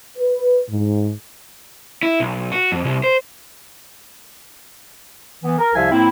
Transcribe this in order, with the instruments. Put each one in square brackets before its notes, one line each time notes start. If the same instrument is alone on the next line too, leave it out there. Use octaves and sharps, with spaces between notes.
[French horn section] B4
G#2
[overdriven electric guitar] E4
B1
F#4
F2
C2
C5
[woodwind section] E3 B3
A#4
C2 C3 F3 E5 F5 G#5
A2 A#3 C4 E4